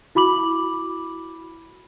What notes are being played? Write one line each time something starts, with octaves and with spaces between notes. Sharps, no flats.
E4 F#4 B5 D6 F#7